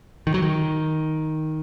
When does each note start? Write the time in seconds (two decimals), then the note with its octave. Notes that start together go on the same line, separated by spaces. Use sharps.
0.27 D#3
0.34 F#3
0.42 D#3